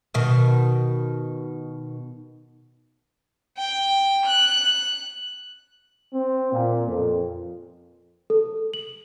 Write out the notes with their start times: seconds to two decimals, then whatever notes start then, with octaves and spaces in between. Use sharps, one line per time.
0.14 B2 D#3
3.58 G5
4.26 F#6
6.14 C4
6.53 A#2
6.87 F2
8.30 A4
8.74 F#7